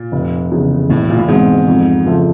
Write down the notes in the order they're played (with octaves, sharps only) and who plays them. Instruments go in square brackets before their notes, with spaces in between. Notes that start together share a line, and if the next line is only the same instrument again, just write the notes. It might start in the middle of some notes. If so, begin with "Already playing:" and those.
Already playing: [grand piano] A#2
[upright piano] F1
E2 C#3
[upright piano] E1 [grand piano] A2
[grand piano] A#2
A2
[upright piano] E2 B2 G#3 C4 [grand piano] G#2
[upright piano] F2
C#3 F3 A3